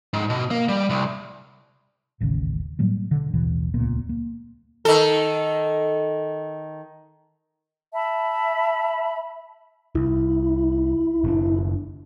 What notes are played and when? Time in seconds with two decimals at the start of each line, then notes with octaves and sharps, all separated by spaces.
0.14 G#2
0.30 B2
0.51 A#3
0.69 G3
0.90 C2
2.20 D#1 A1 D#2 C#3
2.79 A2 F#3 G3 A#3
3.11 B2 D3
3.34 A1 D#2 B2 E3
3.74 D#1 C#2 A#2 B3
4.09 A#3
4.85 D#3 A4
7.93 E5 A5 B5
9.95 C2 E4
11.24 F#1 C4 D4